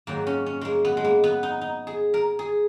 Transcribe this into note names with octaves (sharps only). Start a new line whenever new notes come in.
G#2 D#3 F#3 A#3
C#4
C#4
G#3 A#3
B3
G#3
A#3
B3
D#4
D#4
G#4
A#4
G#4